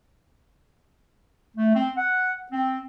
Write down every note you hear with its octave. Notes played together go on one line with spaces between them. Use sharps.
A3
C4
F#5
C4